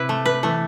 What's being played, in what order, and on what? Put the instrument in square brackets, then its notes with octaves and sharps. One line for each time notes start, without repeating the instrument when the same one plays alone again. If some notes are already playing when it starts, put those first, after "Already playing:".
Already playing: [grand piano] C3 [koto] E4 B4
[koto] A3
B4
[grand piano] E3 [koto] A3